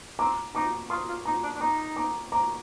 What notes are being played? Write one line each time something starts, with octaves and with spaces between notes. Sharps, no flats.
C4 A#5 D6
D#4 A#5 D6
F4 C6 D#6
F4
D#4 A#5 D6
D4
D4
D#4 A#5 D6
A#5 D6
A#5 D6